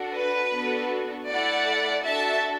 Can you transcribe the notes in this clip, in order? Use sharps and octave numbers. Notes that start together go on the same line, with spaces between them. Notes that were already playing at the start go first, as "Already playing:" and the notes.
Already playing: D4 F#4 A4
B4
B3 D4 F#4 A4
A3 E4 A4 D5 F#5
D4 F#4 A4 E5 A5